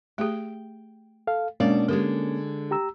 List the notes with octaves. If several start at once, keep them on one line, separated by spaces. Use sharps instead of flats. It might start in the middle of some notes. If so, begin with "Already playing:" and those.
A3 G4 G#4 G5
A4 F5
B2 G#3 A#3 C#4 D4 D5
D3 G#3 G4 A#4
G4 A#5 E6